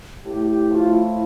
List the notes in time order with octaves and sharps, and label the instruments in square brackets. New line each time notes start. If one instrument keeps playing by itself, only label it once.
[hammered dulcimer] A2 [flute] G4
[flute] G4
[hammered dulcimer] F3 [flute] G4
[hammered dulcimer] A3 [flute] F4
[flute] E4